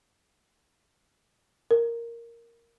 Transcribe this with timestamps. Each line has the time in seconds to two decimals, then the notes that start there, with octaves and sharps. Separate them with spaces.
1.71 A#4